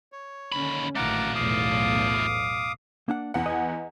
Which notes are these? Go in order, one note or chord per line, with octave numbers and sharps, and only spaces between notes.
C#5
D#2 D3 C#4 B5
A1 A#2 D#3 A3 F4 F#5 A#5 D6
B1 E2 A2 F5 D6 D#6
A#3 D4 F#5
E2 F#5
D#5 G#5